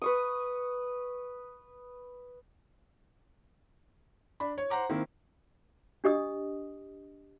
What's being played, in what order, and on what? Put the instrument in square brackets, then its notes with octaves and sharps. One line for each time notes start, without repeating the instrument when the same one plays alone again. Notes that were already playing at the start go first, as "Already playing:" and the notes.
[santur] B4 C#6 D#6
[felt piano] D4 B5
C#5
C5 F#5 A#5 D6
D#3 A#3 C4 E4
[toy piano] D4 G4 D#5 D#6